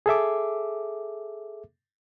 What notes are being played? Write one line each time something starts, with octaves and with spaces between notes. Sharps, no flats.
G#4 A4 E5 D6